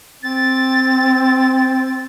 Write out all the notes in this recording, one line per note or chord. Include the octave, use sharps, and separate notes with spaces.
C4 A6